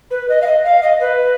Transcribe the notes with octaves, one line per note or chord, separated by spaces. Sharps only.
B4
D#5
F5
D#5
F5
D#5
B4